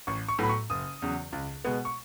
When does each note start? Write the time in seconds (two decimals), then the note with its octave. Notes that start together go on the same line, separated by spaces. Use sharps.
0.07 A1 C#6
0.28 C#6
0.39 A2 F#3 B3 B5
0.49 C#6
0.70 F#1 D#6
1.02 E2 C#3 F#3
1.32 C#2
1.65 B2 G#3 B3
1.85 C#6